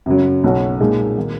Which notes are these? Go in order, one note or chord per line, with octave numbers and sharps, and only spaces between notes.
F#2 C#3 F#3
B1 B2 F#3 C#4 F#4
A#2 G#3 D#4 G#4
D#3 A#3